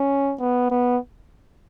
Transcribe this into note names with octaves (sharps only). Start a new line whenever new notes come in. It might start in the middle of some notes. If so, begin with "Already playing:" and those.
Already playing: C#4
B3
B3